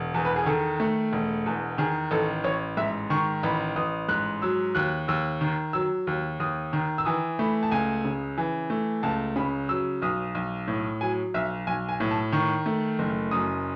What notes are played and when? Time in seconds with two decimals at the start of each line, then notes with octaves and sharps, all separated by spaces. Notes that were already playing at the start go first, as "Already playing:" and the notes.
Already playing: E1
0.14 E2
0.25 B4
0.36 G#4
0.46 D#3 A4
0.80 A3
1.13 E1
1.46 E2
1.78 D#3 G#4
2.11 A1 A4
2.44 A1 C#5
2.77 G#2 E5
3.10 D#3 C#6
3.43 A1 B5
3.76 A1 D#6
4.09 G#2 F#6
4.42 F#3 E6
4.75 D#2 F#6
5.08 D#2 E6
5.41 D#3
5.73 F#3 E6
6.07 D#2
6.40 D#2 D#6
6.73 D#3
6.98 E6
7.05 E3 D#6
7.39 A3 B5
7.63 A5
7.71 C#2 G#5
8.05 C#3
8.38 E3
8.70 A3
9.03 C#2 A5
9.36 C#3 B5
9.69 F#3 E6
10.02 B1 D#6
10.35 B1
10.68 A2
11.01 F#3 G#5
11.34 B1 E5
11.67 B1 G#5
11.89 G#5
12.00 A2
12.11 A5
12.32 D#3 C#6
12.66 A3
12.99 F#1
13.31 F#2 D#6